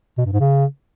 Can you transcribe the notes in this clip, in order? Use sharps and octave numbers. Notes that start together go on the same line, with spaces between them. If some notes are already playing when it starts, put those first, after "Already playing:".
B2
G2
G#2
C#3